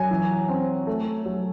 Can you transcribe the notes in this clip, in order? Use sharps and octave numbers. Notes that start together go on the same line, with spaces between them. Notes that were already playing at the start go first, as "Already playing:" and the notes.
Already playing: F#3 G#5
E3
C4
A3
F#3